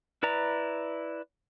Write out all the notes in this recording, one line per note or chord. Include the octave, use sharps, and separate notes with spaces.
E4 B4 D5 A#5